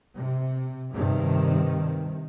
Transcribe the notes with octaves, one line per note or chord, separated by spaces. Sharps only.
C3
G2 C3 D#3